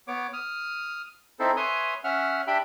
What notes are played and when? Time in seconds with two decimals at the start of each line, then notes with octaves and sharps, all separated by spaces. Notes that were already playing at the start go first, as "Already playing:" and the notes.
0.08 B3 C#5 D6
0.33 D#6 F6
1.40 C4 D#4 E4 A4 C5
1.57 B4 C#5 E5 G#5 C6 D#6
2.04 C#4 E5 F#5 F6
2.47 D4 G4 E5 G5 B5